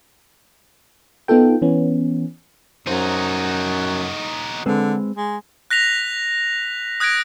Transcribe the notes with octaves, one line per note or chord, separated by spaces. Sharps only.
B3 D#4 F4 A4 G5
E3 B3 C#4
F#2 D#4 F#4 C5
D3 G#3 C4 B4
G#3
F#6 A#6 B6 F7
D#6 F#6 G#6 A#6 D7